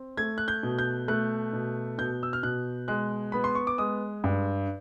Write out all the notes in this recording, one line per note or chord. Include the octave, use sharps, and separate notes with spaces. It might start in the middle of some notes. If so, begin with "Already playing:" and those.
Already playing: C4
A3 G#6
F#6
G6
B2
G6
A3 F#6
B2
B2 G6
E6
F6
B2 F#6
G#3 F#6
B3 B5
C6
C#6
D6
G#3 D#6
G2